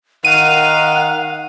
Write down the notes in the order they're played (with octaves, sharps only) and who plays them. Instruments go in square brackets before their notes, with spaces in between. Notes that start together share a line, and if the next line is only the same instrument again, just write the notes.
[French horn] D#3 [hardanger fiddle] F5 [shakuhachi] F#5 [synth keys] D#7